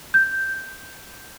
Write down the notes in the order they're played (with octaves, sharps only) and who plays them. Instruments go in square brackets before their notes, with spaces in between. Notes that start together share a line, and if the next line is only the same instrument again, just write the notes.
[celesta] G6